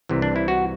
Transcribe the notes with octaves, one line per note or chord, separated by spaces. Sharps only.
C2 C3 E3
D4
E4
F#4